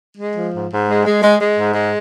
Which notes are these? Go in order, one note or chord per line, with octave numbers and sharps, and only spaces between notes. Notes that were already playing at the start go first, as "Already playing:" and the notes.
G#3
F3
G#2
G#2
G#3
G#3
G#3
G#3
G#2
G#3